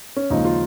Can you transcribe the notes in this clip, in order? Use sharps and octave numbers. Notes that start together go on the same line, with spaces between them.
C#4
D#2 C#3 F3 G#3 D#4
F4